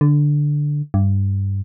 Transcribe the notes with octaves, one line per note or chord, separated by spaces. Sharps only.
D3
G2